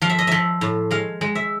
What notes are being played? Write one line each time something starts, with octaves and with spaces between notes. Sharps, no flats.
F3 F5
E5
D#5
F3 E5
A2
G#3 F5
G#3
E5